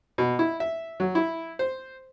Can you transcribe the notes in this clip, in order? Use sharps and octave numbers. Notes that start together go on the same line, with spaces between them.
B2
E4
E5
F#3
E4
C5